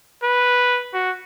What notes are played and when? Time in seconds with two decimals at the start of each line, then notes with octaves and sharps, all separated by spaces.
0.23 B4
0.94 F#4